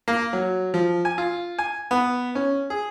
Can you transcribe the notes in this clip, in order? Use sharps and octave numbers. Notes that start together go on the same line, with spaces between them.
A#3
F#3
F3
G#5
F4
G#5
B3
C#4
G#4